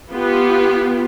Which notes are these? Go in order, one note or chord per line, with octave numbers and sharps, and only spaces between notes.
B3 F4 G4